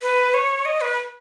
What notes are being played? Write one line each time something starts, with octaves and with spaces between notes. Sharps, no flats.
B4
C#5
D#5
B4